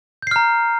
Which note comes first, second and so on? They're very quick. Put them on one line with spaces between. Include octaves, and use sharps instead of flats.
G6 C7 F6 A#5